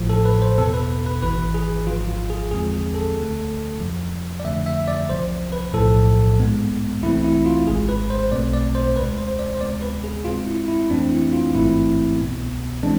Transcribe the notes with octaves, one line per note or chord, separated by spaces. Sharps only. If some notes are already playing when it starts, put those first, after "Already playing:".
Already playing: A1 A2 F3
A4
B4
C5
E2 B2 B3 A4
B4
B4
G#1 G#2 E3 B4
G#4
G#1 G#2 F3 F4
F4
G#4
E2 D3 F3 G#3 C4 G#4
G#4
A4
D2 D3 A3
F2 C3 F3
D5
F2 D3 F3 A3 E5
E5
D5
C2 C3 F3 C5
B4
B1 A2 F3 A4
G#2 G#3 B3
C2 C3 E3 A3 C4 E4
E4
F4
G#1 G#2 G#3 G#4
B4
C5
B1 B2 A3 C4 D5
D5
C5
D2 C3 G#3 B4
C5
D5
C5
D2 C3 G#3 B3 D5
B4
G#4
G#2 G#3 C4 F4
E4
E4
F2 E3 A3 C4 D4
E4
F4
A1 G#2 E3 A3 C4 E4
C2 B2 B3
E3 G#3 C4 D4